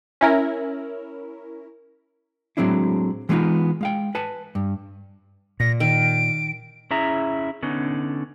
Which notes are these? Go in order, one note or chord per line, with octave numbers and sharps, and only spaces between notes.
C#4 E4 A#4
A2 F#3 G#3 C4 D4 E4
E3 G#3 B3 C#4 D#4 F4
G#3 F5 G5
B4 G#5 A5
G2
A#2 A#6
D#3 D7
C#4 E4 G#4 E5 A#5
D3 B3 C#4 D#4